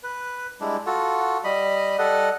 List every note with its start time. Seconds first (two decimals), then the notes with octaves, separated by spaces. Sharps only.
0.03 B4
0.61 G3 G#3 D4 E4
0.86 F4 F#4 A4
1.44 G3 D#5 B5
1.99 G3 A4 D#5 F#5